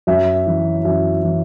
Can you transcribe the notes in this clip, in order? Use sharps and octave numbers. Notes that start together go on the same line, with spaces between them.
F#2 E5
E3
F#2 E5
E3